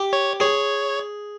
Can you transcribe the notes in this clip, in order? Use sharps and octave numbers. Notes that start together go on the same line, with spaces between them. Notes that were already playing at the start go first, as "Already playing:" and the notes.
Already playing: G4
C#5
G#4 C#5